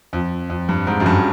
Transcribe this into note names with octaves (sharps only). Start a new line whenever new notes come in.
F2
F2
G2
G#2
F#2
G2